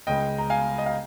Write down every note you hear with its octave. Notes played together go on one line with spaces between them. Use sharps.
C#2 C#3 G#3 D#5 G5
A#5
F5 G#5
D#5
F5